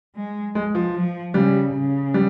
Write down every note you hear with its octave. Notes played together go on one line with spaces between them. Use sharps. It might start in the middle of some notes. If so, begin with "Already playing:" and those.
G#3
G#3
F3
F3
C#3 G3
C#3
G3